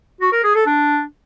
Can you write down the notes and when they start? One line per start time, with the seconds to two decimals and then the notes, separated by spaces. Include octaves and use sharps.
0.21 F#4
0.32 A#4
0.44 G#4
0.55 A4
0.67 D4